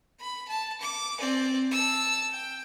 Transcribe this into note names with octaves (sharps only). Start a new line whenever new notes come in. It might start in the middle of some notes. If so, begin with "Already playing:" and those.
B5
A5
D6
C4 D5
A5 E6
G5